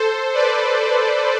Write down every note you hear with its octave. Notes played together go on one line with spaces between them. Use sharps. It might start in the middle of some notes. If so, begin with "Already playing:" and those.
Already playing: A4 C5
B4 D5